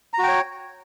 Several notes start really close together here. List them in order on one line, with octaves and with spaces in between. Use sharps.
A#5 F#4 G5 C#5